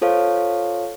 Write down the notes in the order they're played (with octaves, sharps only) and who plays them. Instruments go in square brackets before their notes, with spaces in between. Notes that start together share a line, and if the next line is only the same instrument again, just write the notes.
[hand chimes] F4 A4 C5 C#5 F5